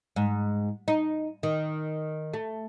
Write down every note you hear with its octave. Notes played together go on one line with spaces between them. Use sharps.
G#2
D#4
D#3
A3